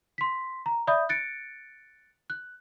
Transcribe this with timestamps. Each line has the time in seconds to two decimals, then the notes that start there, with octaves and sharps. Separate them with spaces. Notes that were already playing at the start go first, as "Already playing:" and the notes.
0.18 C6 B6
0.66 A#5
0.87 D5 E5 B5 D#6 G6
1.09 F#6 A6 C#7 D7
2.30 F#6